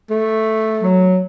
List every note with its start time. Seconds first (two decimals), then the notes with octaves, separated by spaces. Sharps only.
0.10 A3
0.82 F#3